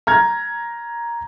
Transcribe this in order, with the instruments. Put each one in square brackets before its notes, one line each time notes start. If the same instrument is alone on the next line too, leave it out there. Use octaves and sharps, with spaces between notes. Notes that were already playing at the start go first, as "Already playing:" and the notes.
[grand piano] A#5 F6 G#6